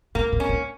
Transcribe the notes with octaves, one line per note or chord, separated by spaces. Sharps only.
A2 A#3
A2
C#4
A2